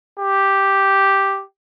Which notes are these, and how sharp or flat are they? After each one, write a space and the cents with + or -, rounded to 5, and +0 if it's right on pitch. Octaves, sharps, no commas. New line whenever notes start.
G4 +0